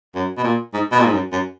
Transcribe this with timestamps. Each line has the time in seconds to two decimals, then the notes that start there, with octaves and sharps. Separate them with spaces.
0.15 F#2
0.37 B2
0.44 A#2
0.73 G#2
0.92 B2
0.99 A#2
1.05 G#2
1.13 F#2
1.32 F#2